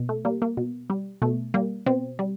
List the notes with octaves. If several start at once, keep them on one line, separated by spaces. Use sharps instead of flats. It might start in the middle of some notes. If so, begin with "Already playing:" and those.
Already playing: B2
A3
G3 A#3
A#3
B2
G3
B2 A3
G3 A#3
B2 C4
G3